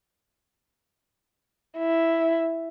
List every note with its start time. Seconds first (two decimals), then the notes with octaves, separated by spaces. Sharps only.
1.78 E4